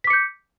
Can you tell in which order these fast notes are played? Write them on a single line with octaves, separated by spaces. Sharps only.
B6 D6 C#7 G6